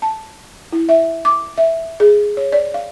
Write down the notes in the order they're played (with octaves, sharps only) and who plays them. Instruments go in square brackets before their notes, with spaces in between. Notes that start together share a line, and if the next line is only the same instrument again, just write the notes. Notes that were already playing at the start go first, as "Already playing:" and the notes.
[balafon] A5
E4
E5
D6
E5
G#4
C#5
D5
F5